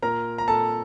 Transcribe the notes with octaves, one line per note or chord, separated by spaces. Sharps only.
A#2 A#4 A#5
A#5
A#2 A4 A5